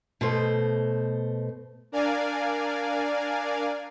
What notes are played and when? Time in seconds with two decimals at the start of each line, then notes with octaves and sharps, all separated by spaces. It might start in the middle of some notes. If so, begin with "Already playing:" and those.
0.21 B2 A3 C5 D#5
1.92 D4 A#4 D5 F5 G#5